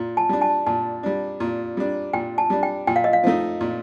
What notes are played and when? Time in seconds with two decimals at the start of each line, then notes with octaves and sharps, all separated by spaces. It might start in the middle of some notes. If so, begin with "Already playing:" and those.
Already playing: A#2
0.17 A5
0.29 G3 D4
0.41 A5
0.67 A#2 A5
1.03 G3 D4
1.40 A#2
1.77 G3 D4
2.13 A#2 G5
2.38 A5
2.50 G3 D4
2.63 G5
2.87 A#2 G5
2.96 F5
3.04 D#5
3.13 F5
3.24 F3 A3 D#4
3.61 A#2